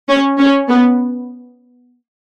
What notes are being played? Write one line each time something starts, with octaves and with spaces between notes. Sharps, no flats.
C#4
C#4
B3